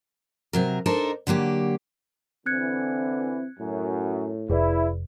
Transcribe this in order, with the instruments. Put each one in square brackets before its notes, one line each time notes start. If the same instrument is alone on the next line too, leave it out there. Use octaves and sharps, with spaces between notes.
[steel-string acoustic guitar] C3 F#3 A#4
D4 D#4 A4 A#4 C5
D3 F#3 A#3 G4
[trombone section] D3 E3 [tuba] C4 [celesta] F#6 G#6 C#7
[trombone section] F#2 [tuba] A2
[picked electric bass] F1 [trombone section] E4 [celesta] G#4 B4 D5